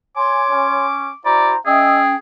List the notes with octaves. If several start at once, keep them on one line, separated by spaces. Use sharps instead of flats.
C#5 G#5 C6 D6
C#4
E4 F#4 C5 D5 A#5
C#4 G#4 D#5 E5 G5